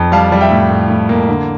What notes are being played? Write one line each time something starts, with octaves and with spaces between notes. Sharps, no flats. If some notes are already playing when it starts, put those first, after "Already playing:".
Already playing: F2
G3 F5 A5
G3
E5 G5
A2
A2
A2
A#3
D3